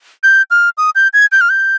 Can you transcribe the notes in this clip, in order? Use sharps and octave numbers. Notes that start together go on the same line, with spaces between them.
G6
F6
D#6
G6
G#6
G6
F6
G6